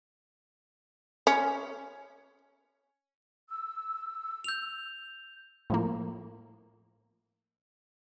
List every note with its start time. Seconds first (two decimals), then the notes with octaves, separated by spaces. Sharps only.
1.27 C#4
3.49 E6
4.44 G6 F7
5.70 A2 F3 A#3